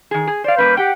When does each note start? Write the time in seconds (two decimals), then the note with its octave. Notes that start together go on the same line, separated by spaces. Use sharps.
0.11 D#3 G#4
0.27 G#4
0.44 C5 D5 F5
0.58 G3 A#3 C#4 B4 G6
0.77 G4 F#5 G5